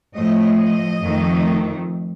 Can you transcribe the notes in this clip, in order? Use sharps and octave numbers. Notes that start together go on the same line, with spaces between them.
A2 F3 A3 D#5
D#5
F2 D#3 A3